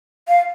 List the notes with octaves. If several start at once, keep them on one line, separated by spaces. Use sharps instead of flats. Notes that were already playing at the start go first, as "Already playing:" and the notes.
F5